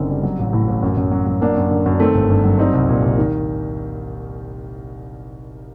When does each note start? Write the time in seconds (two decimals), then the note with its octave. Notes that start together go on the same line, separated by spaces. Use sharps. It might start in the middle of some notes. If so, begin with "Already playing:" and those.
Already playing: F#1 F#2 D3 C4 D#4
0.10 G3
0.23 F#3
0.39 A1
0.53 A2
0.67 A1
0.83 F#2
0.97 F#2
1.11 F#3
1.27 F#3
1.41 F#3 A#3 D4
1.57 F#2
1.70 D3
1.86 F#2
1.94 D4
2.00 D#3 A3 C4
2.14 G1
2.30 G2
2.44 F#3
2.58 G3 C4 D#4
2.73 C2
2.89 A#2
3.03 C2
3.18 D#3